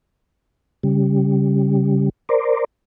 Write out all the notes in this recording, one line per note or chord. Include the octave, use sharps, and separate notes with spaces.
C#3 G3
A#4 C5 D5